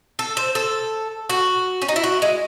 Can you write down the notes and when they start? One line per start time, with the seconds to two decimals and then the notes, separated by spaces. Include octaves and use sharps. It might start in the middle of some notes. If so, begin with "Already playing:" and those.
0.19 A4
0.37 C5
0.55 A4
1.30 F#4
1.82 C#4
1.89 D#4
1.96 E4
2.03 F#4
2.22 G#3